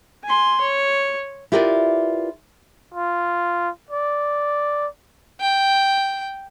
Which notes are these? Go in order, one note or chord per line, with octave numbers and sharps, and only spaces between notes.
G#5 C6
C#5
E4 F4 G4 A#4 B4 D5
F4
D5
G5